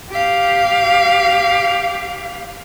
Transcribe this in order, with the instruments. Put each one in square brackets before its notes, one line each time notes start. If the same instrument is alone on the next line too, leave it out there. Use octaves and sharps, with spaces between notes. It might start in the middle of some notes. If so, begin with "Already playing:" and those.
[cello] G4 F5